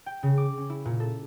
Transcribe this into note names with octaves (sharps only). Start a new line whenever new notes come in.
G5
C#3
D6
C#4
E4
A#2
A4